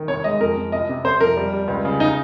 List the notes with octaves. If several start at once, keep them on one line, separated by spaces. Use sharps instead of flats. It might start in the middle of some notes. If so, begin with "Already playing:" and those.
Already playing: D#3
C2 C#5
G#3 D#5
F2 A#4
F2
C2 D#5
C3
C3 C5
F2 A#4
G3
G3
C#2
C#3
D#4